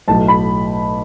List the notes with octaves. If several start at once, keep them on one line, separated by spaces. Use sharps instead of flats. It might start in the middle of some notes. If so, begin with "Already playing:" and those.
B1 A2 F#3 A5
B5